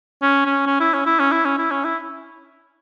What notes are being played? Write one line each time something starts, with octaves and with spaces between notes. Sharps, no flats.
C#4
C#4
C#4
E4
C#4
E4
C#4
E4
C#4
E4
C#4
E4